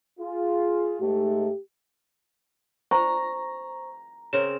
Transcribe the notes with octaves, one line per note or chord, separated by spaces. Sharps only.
F4 G#4
G#2 A3 G4
C5 A#5 C#6
C#3 C4 A#4 E7